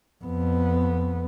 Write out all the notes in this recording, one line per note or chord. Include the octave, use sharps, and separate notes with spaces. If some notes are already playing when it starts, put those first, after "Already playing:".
F2 B3